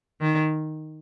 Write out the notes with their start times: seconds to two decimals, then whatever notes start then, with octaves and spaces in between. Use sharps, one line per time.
0.21 D#3